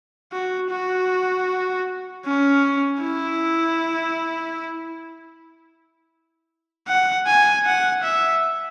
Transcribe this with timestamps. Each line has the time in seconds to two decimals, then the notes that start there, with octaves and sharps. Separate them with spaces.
0.32 F#4
0.71 F#4
2.25 C#4
3.02 E4
6.88 F#5
7.27 G#5
7.66 F#5
8.03 E5